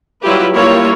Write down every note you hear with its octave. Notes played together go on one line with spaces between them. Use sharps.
F#3 G3 E4 F4 G4 B4
G3 A#3 E4 F4 C#5